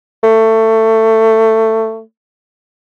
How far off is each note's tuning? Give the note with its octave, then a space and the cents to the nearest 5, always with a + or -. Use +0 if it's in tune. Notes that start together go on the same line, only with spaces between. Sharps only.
A3 +20